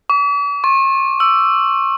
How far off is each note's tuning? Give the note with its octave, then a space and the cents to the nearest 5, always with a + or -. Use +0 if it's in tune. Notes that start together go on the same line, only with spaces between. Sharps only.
D6 -45
C#6 -45
E6 +15